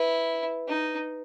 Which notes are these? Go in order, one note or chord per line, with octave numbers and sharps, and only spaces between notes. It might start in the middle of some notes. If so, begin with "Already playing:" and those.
Already playing: E4 B4
D#4